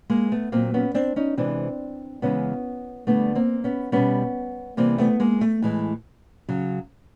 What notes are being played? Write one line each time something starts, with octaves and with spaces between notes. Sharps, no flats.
G#3 A#3
A3 B3
A#2 F#3 A#3 C4
B3 C#4
C4 D4
C#4 D#4
C3 E3 G#3 C4 D4
C#3 E3 G#3 B3 C#4
D3 G3 A3 B3
A#3 C4
B3 C#4
B2 G3 B3 C#4
C3 E3 G3 A#3 C4
A3 B3
G#3 A#3
A3
A2 E3 G#3
C#3 F#3